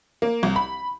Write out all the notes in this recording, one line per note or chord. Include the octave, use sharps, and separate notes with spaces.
A#3
C2
B5